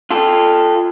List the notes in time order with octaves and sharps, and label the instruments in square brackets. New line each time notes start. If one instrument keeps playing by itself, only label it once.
[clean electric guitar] F4 A4